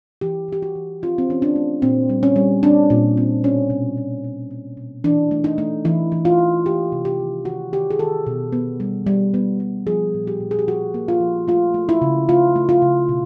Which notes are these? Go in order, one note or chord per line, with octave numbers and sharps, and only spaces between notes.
E3 G4
E3 G4
F#4
E3
C4 F4
C4
E3 C#4
D4
A3
A#2 C4
G3
C#4
G3
C4 D4
A#2
C4
B2 C#4
B2
B2
B2
A#3
B2
E3 D4
A3
D#4
A3
E3 E4
E3
F4
A3
A#3 G4
C3
G4
D#3
D#3 F#4
D#3 G4
G#4
D#3 A4
B2
B3
G3
G3
B3
G3
F3 G#4
A#2
G4
A#2
G#4
G4
F3 F#4
A#3
F4
F3
A3 F4
A3
E4
C#3
A3 F4
A3
F4
C#3
B2